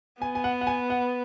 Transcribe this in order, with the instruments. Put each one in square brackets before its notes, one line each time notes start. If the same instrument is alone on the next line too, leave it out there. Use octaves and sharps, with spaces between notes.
[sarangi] B3 [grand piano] G#5
[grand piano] G#5
F#5
F#5
G#5
F#5